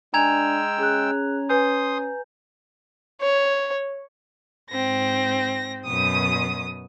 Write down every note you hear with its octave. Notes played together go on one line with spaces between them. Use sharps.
G#3 D4 G5 G#5 A#5 E6 G#6 F7
C#4 G#4 F#6
B4 G#5 C6 D#6 G6
C#5
G#2 C4 A#6
F#2 B2 D#6